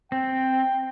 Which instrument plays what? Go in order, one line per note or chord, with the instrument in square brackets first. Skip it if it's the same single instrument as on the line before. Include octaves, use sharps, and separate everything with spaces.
[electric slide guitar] C4 [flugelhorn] G5